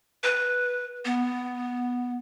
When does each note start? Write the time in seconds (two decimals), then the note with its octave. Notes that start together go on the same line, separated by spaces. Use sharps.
0.24 B4
1.05 B3